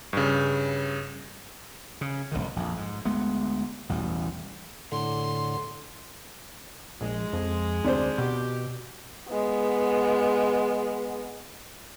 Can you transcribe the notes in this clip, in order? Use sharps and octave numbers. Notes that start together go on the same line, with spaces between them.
G2 C#3
C#3
F1 A#1 D3 D#3
A#1 F2
G#2
D2 G#3 A3 B3
A1 E2 B2 G3
A2 D3 C6
A#1 G#3
F2
D2 C3 D4 C5
B2 G4
G#3 B3